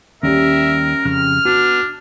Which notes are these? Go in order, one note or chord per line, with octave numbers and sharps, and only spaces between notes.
D#2 G3 C#4 G4 A#4 E5
F2 C#3 F6
B3 D4 F#4